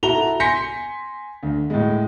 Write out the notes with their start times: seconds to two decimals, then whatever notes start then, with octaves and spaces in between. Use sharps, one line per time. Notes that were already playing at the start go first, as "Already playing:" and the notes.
0.03 E4 F#4 A4 A#5 F7 G7
0.40 G#5 C6 G6 A#6 B6 C#7
1.43 D2
1.70 A2 G#3